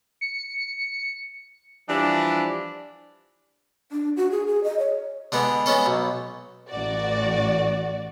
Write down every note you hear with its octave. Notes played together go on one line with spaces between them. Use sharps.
C#7
E3 F3 G3 D4
D4
F#4
G#4
G#4
D#5
C#5
D3 G#3 B3
G#3 B3 C#4 A4
B1
A1 F#4 D5